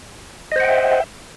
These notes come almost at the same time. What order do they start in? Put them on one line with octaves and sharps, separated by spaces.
D#5 C5 F#5 G5 E5